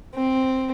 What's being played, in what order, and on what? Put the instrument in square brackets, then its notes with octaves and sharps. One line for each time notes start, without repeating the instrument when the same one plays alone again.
[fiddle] C4